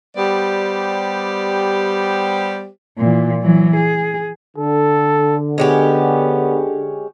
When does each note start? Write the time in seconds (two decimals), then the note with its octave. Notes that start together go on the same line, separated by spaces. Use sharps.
0.17 G3 B3 G4 C5 D5
2.98 A#2 E3
3.42 E3 F#3
3.76 G#4
4.57 D3 A4
5.58 G#3 B3 C#4 G4